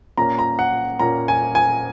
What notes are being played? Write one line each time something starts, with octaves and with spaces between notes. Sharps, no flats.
A#2 A#3 C#4 A#5
A#5
F#5
A#2 A#3 C#4 A#5
G#5
G#5